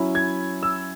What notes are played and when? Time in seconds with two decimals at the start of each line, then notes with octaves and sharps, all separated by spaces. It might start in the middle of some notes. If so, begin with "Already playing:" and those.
Already playing: F#3 C#4 E4
0.15 G#6
0.63 E6